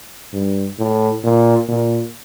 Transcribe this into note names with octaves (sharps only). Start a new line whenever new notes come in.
G2
A2
A#2
A#2